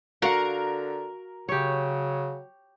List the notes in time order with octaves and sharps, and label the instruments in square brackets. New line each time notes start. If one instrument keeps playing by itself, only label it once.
[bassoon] D3 [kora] F#4 F5 F#5 [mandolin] A#4
[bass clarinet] C#3 [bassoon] F#3 [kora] G4 C#5